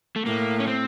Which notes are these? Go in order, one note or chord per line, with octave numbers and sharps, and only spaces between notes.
A3
A2 A#3
C#4
C4